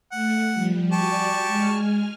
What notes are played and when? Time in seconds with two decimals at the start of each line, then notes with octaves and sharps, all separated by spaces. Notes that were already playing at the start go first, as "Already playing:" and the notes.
0.12 A3 F#5
0.53 F3 G3
0.92 F#4 G4 D5 G#5 A5 C#6
1.47 G#3 G#5 F6